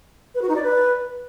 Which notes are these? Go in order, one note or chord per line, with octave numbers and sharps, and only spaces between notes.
B4
F#4
D#4
D5
B4